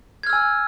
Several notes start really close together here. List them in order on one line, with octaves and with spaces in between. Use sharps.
G#6 F6 E6 G#5